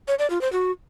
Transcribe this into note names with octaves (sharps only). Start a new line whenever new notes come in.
C#5
D5
F4
C5
F#4